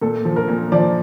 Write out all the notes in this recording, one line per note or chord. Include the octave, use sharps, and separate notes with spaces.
A#2 A4
F3
A#4
A#2
F3 D5